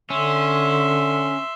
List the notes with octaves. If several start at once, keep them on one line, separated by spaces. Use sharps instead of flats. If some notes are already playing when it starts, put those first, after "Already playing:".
D3 C#4 E5 C6